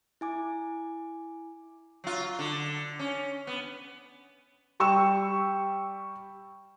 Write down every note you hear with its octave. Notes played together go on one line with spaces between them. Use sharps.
E4 G#5 D6
F#3 F4
D3
C#4
B3
G3 G5 C#6 E6 E7